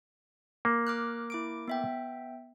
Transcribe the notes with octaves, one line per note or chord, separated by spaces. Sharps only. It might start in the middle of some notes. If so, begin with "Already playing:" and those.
A#3
D6 F6 F#6
E4 D6 D7
B3 E5 G5